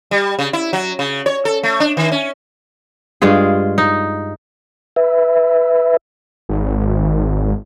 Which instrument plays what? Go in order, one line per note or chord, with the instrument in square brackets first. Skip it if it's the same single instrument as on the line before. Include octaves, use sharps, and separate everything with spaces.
[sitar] G3
C#3
E4
F#3
C#3
C#5
A4
A3
D4
D#3
C#4
[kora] G2 G#3 F4 G#4
D#4
[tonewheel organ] B4 E5
[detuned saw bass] G#1